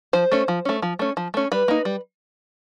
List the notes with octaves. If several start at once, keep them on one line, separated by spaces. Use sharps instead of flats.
F3 C5
A3 C#4
F3
A3 C#4
F3
A3 C#4
F3
A3 C#4
G3 B4
A#3 D#4
G3